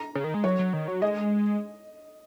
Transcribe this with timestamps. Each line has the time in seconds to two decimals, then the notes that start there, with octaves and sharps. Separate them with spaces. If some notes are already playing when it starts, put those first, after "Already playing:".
Already playing: A#5
0.15 C#3
0.24 D#3
0.34 G#3
0.44 F#3 C#5
0.59 F#3
0.73 D#3
0.88 F#3
1.02 G#3 D#5